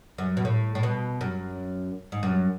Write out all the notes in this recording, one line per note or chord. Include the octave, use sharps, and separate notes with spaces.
F#2
B2
A2
A2
B2
F#2
G#2
F#2